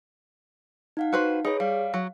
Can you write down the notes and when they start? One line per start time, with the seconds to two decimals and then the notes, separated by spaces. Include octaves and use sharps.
0.97 D#4 F5 F#5
1.13 F#4 B4 C5
1.45 D#4 G#4 B4 C#5
1.60 G3 F5
1.94 F#3